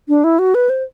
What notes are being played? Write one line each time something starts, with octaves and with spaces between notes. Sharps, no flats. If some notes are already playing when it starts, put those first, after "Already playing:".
D4
E4
F#4
B4
C5